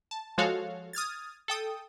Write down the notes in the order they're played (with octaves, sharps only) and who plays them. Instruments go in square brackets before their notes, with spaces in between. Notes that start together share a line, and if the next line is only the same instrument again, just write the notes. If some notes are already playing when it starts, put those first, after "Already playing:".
[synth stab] A5
F3 G#3 F#4 A4 C#5 F5
D#6 F6 G#6 A6
A4 G5 D#6